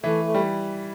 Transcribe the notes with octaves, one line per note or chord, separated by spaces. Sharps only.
E3 A3
A3
G3